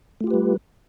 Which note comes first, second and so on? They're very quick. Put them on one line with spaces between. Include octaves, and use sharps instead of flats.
A3 F4 G4 B4 G3